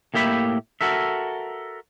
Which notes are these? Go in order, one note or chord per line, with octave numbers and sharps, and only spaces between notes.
A2 A#3 G4 E5 B5
F#4 A4 A#4 E5